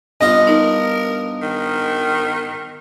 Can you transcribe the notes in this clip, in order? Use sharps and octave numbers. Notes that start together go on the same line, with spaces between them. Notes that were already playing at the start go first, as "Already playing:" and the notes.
G2 B3 F4 D#5
D#4 A#4
D#3